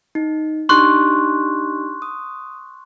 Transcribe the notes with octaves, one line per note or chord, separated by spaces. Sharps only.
D#4
D4 D#4 G4 C6 C#6 F#6
D#6